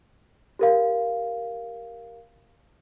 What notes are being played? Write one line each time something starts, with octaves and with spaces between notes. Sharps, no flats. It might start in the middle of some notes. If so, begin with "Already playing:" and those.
G4 A#4 F5